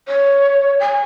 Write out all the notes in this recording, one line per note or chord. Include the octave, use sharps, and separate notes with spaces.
C#5
G#5